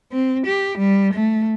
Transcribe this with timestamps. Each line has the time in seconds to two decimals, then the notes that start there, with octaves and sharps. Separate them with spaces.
0.13 C4
0.47 G4
0.79 G3
1.14 A3